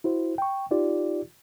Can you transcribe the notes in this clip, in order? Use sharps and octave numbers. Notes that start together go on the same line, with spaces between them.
E4 F#4 C5
G5 C#6
D#4 F4 G4 D5